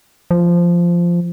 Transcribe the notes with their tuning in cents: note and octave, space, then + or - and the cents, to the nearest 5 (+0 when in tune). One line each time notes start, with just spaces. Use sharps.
F3 -10